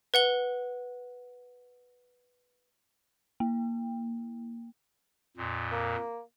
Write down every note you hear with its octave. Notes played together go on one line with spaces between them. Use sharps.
B4 F#5 G7
A#3
F2 A#2
A#3